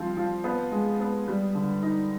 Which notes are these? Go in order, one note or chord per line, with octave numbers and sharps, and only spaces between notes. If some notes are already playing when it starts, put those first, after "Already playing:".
Already playing: F3 G3 C4
F3
B3
G#3
B3
G3
D3
D#4